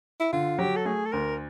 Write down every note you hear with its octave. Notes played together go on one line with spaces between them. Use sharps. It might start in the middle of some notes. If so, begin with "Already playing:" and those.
E4
D3 F4
F#3 G4
A4
A3 G#4
A4
D2 A#4